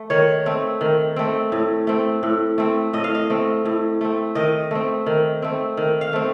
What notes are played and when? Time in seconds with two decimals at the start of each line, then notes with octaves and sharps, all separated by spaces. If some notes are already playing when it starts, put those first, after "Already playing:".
Already playing: A3
0.10 D#3 C#5
0.46 A3 C4
0.81 D#3
1.16 A3 C4
1.52 A2
1.87 A3 C4
2.23 A2
2.58 A3 C4
2.93 A2 D#5
3.04 F5
3.15 D#5
3.30 A3 C4
3.65 A2
4.01 A3 C4
4.35 D#3 D#5
4.71 A3 C4
5.06 D#3
5.42 A3 C4
5.77 D#3
6.01 F5
6.13 A3 C4